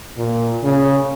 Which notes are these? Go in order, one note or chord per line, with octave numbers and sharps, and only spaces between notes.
A#2
C#3